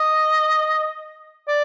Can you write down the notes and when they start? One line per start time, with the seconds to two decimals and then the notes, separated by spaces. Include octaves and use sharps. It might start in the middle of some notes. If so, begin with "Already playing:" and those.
Already playing: D#5
1.48 D5